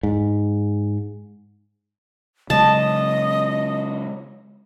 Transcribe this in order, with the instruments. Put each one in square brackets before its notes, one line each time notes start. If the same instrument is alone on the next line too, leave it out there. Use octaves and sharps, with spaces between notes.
[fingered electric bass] G#2
[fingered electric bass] C#3 F#3 G#3 [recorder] D#5 [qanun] A5